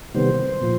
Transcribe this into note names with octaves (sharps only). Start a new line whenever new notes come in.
C3 D#3 G3 B3 C5
A#2 F3